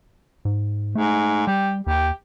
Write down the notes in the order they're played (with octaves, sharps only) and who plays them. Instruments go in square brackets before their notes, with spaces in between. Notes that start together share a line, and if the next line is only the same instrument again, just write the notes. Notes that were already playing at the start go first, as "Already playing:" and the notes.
[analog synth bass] G#2
[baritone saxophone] G#2 [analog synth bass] A3
[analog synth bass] G3 [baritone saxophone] G4
[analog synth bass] D#2 [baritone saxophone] G4